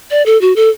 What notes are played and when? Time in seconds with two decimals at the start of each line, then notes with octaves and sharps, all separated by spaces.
0.11 D5
0.26 A4
0.41 F#4
0.56 A4